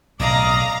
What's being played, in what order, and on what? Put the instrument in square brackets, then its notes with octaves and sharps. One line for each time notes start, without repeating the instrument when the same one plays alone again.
[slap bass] B1 A2 C3 [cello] D5 D#5 [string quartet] F5 A#5